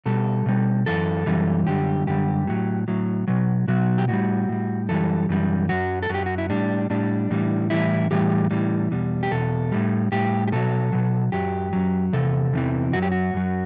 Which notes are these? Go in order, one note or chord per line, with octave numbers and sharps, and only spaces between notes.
B2 G3 A4
B2 G3
F#2 E3 A4
F#2 E3 G3
F#2 D3 G3 G4
F#2 D3 G3 G4
A2 F#3
A2 F#3
B2 F#3
B2 F#3 F#4
G4
A2 G3 F#4
A2 G3
F#2 E3 G3 A4
F#2 E3 G3
F#2 F#3 F#4
A4
F#2 F#3 G4
F#4
E4
A2 G3 D4
A2 G3 D4
A2 E3 G3
A2 E3 G3 E4
A2 E3 G3 G4
A2 E3 G3
E2 B2 G3
G4
E2 B2 A4
A2 G3
A2 G3 G4
G4
B2 F#3 A4
B2 F#3
F#2 F#3 G4
F#2 F#3
E2 C3 A4
E2 C3 E3
F#2 F#3 F#4
G4
F#4
F#2 F#3